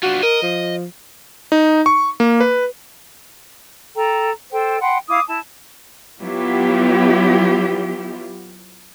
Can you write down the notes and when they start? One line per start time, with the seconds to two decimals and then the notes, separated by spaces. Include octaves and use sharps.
0.03 D4 F4 F#4
0.23 A#4 D#5
0.43 F3
1.52 D#4
1.86 C#6
2.20 A#3
2.40 B4
3.95 A4 G5 A#5
4.51 A4 C5 G5
4.81 F#5 G5 B5 C6
5.08 E4 F5 D6 D#6
5.27 E4 A5
6.21 F#3 B3 E4 F4 G4